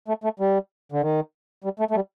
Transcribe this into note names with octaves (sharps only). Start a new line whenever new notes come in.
A3
A3
G3
D3
D#3
G3
A3
A3
G3